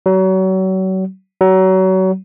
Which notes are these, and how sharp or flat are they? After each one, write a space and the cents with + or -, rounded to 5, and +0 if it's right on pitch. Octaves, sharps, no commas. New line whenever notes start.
F#3 +35
F#3 +30